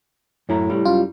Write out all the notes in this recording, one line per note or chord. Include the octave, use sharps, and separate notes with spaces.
F#2 A2 E4 A#5
G3 E4
F#2 F4